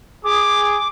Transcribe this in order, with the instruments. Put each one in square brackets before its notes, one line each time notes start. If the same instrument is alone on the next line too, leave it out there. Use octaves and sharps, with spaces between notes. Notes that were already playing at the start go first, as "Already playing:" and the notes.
[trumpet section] G#4 [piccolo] D6